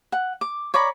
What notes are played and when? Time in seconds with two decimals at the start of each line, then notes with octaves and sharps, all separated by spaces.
0.12 F#5
0.41 D6
0.74 C#5 D5 A#5 B5